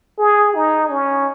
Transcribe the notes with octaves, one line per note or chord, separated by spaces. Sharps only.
G#4
D#4
C#4